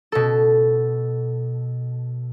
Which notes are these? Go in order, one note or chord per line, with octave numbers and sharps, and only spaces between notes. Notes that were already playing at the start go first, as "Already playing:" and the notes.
B2 A4